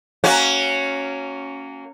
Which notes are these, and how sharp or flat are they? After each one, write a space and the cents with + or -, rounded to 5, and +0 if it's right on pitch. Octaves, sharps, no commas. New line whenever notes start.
A#3 -25 C#4 +0 F#4 +0